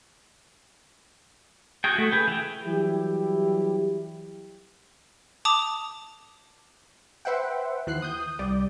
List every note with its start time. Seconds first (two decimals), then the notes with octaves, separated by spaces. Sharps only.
1.84 F#4 G#4 G5
1.96 A3 F#4
2.12 G#4 B4 G5
2.28 E3 G5
2.66 E3 F#3 G3 E4 G4
5.45 A5 D6 D#6 F7
7.25 B4 C5 E5 F#5 G5
7.87 D#2 E3 F#6 C7
8.02 D#6 G6
8.39 C2 G3 D5